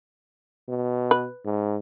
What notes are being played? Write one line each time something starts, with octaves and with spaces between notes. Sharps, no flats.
B2
B4
G#2